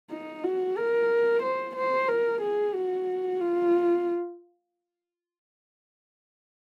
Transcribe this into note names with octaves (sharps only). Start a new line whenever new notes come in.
D#4
F#4
A#4
C5
C5
A#4
G#4
F#4
F4